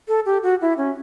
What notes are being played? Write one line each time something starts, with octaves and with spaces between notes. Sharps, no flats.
A4
G4
F#4
E4
C#4